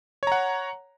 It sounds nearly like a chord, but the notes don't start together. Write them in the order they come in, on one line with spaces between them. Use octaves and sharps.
C#5 A#5 F#5